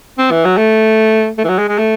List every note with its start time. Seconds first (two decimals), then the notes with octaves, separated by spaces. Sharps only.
0.18 C4
0.31 E3
0.45 F#3
0.57 A3
1.38 A3
1.44 E3
1.49 F#3
1.58 G#3
1.69 G#3
1.78 A3